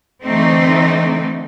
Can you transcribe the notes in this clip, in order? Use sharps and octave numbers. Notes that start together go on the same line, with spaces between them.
D3 E3 A3 C4 D#4